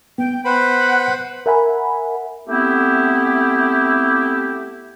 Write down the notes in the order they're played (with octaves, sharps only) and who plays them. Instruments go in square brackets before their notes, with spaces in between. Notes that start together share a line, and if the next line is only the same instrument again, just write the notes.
[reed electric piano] B3 [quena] G5
[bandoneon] B4 C5 B5 [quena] F#5
[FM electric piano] A#4 E5 F#5 G#5 B5
[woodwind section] A3 B3 C4 E4 G4